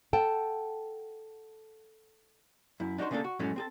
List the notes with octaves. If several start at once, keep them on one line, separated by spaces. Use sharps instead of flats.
A4 F#5 G5 A5
F#2 E4
D4 D#4 F#4 A#4 C5
C#3 A#3 D4 G4 A4
F#4
F#2 A2 F#3 G#3 A3 C#4
C4 G#4 A4